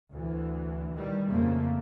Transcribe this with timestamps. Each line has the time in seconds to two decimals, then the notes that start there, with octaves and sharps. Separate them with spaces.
0.12 D2 E3
0.95 D#3 E3 G3
1.29 F2 C#3 A3 A#3